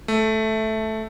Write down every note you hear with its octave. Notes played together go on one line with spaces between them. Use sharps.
A3